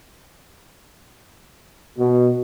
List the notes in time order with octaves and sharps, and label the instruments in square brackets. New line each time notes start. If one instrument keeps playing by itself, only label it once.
[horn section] B2